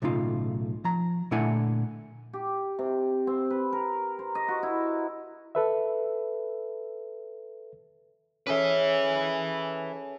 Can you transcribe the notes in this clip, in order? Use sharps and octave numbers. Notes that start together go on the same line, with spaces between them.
B1 A2 C#3 D#4 F4
F3 A#5
A#2 D3 A3 E4 F#5 G#5
G4
C3
C4
B4
A#4
C5
D#5
F#4
E4
A4 B4 E5
C#4 G#4 A4 B4 E5